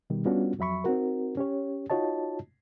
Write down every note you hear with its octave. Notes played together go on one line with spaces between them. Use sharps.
B2 D#3 G3
G3 B3 C#4 D4 F4 F#4
F2 F#3 E5 B5 C#6
C4 D#4 F#4 A#4
C#4 G4 C#5
D#4 F4 F#4 C#5 D#5 A5